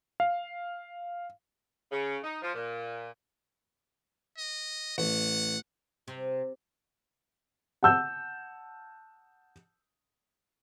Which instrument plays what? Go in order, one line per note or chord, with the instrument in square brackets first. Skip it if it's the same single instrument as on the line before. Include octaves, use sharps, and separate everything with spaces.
[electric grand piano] F5
[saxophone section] C#3
D#4
F3
A#2
[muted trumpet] D#5
[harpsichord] A1 [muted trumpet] F#5
[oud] C3
[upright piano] F#5 A5 E6 G6